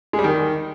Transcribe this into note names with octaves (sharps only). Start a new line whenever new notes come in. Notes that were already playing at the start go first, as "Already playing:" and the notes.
G#3
G3
D#3